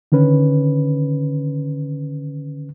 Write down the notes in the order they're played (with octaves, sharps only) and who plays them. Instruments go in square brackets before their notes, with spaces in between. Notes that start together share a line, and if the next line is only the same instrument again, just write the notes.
[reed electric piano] D3 D#3 C#4 B4